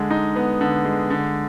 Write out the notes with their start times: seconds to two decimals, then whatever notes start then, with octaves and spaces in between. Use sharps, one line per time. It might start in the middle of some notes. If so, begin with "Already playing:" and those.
Already playing: D3 G#3
0.11 D#4
0.36 B3
0.61 D3
0.85 G#3
1.10 D3